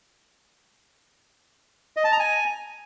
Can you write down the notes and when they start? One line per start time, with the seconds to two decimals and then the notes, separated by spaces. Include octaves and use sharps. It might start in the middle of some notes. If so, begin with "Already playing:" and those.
1.97 D#5
2.04 A5
2.12 A#5
2.20 G#5